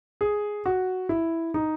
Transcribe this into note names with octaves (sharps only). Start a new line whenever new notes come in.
G#4
F#4
E4
D#4